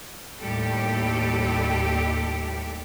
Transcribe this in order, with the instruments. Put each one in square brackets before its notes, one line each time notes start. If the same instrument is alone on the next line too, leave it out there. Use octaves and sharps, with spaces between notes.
[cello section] D#2 A2 G3 G4 A4